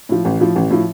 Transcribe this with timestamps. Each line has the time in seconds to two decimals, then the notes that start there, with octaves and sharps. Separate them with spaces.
0.09 A2 F3
0.25 A1
0.40 A2 F3
0.56 A1
0.70 A2 F3